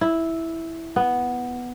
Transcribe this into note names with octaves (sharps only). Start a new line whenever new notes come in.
E4
B3